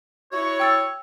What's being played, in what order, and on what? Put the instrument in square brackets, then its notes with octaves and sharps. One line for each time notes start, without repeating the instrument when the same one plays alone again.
[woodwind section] E4 F#4 C#5
[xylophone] G5 E6 A6